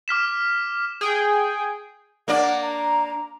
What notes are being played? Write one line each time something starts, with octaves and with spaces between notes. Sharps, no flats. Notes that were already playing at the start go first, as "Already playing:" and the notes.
D6 F6 B6 E7
G#4 G5
A#3 D4 D5 F#5
A#5